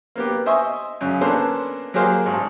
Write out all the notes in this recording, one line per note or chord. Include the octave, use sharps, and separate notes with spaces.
A#3 B3 G4
C5 D#5 E5 G#5 C#6
F#2 C#3
A#3 B3 C#4 D4 A4 C5
F#3 A#3 G4 G#4 C5 F5
A1 G#2